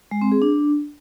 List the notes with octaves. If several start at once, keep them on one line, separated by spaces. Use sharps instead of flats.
G#3
C4
G#4
D4